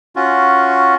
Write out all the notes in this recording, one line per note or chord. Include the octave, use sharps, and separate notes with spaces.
C#4 F4 F#4